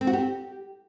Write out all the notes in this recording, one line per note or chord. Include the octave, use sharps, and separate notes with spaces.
C4
F#4
G4